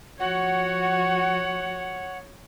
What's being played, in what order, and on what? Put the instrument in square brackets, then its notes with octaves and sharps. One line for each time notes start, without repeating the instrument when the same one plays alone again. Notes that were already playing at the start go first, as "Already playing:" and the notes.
[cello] F3 F#4 [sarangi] C#5 [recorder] F#5